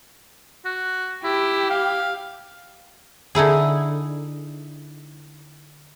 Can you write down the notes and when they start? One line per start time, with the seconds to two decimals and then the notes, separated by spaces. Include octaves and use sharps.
0.65 F#4
1.24 E4 G4
1.70 F5
3.35 D3 D#4 E4 G#4